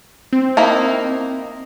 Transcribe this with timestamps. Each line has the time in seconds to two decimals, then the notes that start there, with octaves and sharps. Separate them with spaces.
0.33 C4
0.57 A#3 D#4 E4